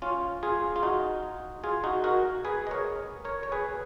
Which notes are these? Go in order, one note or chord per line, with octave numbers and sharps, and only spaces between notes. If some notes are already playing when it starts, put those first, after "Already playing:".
C#4 F4
F4 G#4
F4
D#4 F#4
F4 G#4
D#4 F#4
F#4 A#4
G#4 B4
D#5
A#4 C#5
A#4 C#5
C#5
G#4 B4